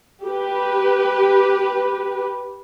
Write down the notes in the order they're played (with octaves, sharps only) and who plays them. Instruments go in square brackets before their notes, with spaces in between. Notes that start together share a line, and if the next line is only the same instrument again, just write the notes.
[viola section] G4 B4